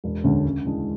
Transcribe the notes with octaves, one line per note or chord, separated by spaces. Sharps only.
E1
D2 D3 G#3 C#4
C#3
E3 G#3 D4